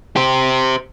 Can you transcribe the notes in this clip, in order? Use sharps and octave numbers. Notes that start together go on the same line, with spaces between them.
G4 C5